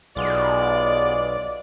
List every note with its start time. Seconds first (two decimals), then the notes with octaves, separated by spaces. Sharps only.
0.16 B1 G#3 B3 F4 D5